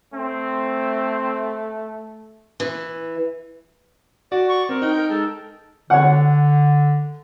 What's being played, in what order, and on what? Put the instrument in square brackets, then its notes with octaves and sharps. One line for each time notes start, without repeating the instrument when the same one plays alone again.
[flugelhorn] A3 [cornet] C4
[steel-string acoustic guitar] E3
[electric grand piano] F#4 [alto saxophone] D5
[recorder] C#6
[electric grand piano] C4 [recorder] A#4
[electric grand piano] D#4 [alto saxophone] G5
[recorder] A#4
[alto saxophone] G#3 [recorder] A4
[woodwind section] D3 [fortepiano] C#5 F#5